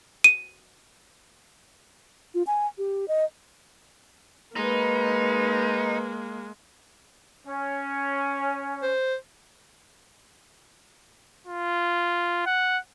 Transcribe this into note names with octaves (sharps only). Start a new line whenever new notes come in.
D#7
F4
G#5
G4
D#5
G#3 A#3 D#4 B4
C#4
C5
F4
F#5